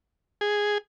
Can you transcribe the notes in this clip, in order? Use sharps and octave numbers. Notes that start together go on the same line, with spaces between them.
G#4